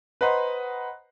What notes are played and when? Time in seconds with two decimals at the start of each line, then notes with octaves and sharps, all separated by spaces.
0.21 B4 C5 D#5 F#5 A#5 C6